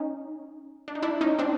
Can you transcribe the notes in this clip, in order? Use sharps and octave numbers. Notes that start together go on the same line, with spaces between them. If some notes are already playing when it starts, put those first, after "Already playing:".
Already playing: C#4 D#4
D4
D#4
D4 E4
C#4 D#4
C4 D4